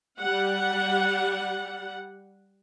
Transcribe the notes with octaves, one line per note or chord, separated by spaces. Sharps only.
G3 F#5